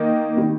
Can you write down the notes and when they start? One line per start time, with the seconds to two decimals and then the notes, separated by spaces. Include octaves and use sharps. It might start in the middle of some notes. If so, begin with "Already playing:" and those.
Already playing: D#3 A#3 D#4
0.37 D#3 G3